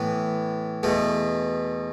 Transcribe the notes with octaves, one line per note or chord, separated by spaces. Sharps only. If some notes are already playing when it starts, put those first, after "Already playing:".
Already playing: A2 E3 B3
E2 B2 A3